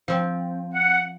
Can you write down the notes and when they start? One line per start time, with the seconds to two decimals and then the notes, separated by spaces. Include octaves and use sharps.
0.08 F3 C4
0.71 F#5